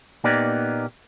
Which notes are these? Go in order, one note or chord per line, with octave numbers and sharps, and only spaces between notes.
A#2 A#3 B3 D#4 G4 D5